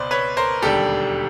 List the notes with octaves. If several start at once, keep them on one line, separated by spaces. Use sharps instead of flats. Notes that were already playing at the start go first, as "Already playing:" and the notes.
Already playing: C#2 B2 B4 C5 D5
B4 C#5
A#4 C5
E1 D#2 D3 G3 G4 A4